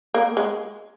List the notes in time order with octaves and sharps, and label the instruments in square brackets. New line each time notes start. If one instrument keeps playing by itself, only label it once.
[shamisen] A#3
G#3